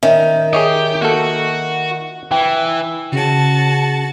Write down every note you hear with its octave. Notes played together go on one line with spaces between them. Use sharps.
D#3 C#4 E5
G4 G#4 C#5 D#5
A#3 F#4 A4
E3 G5
C#3 F#4 A5